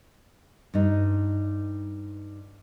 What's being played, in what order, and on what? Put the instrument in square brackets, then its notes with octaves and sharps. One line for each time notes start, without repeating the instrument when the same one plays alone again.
[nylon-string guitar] G2 D#4